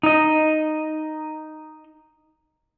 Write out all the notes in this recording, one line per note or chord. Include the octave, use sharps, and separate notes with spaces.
D#4 D#5